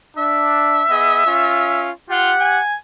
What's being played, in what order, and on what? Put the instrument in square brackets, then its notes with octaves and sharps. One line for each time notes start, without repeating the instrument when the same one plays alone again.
[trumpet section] D4 [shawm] E5
[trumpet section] B3 G#4 D#5
C#4 F4
[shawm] F4 [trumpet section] G4 F#5
[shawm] G#5